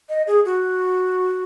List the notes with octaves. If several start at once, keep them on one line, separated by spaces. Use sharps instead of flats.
D#5
G#4
F#4